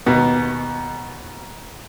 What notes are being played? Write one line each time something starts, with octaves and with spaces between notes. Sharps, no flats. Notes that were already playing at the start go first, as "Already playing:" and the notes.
D#2 B2 B3